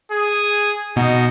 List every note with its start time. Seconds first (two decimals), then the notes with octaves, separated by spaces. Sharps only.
0.12 G#4
0.96 B2 D#4